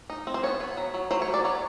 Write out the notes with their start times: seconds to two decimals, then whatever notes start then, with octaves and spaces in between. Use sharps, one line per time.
0.10 D#4
0.27 C4
0.34 C5
0.43 B3 C#5
0.60 B3
0.77 F#3
0.94 F#3
1.11 F#3 C5
1.22 C#5
1.28 B3
1.34 D5
1.44 F#3 C#5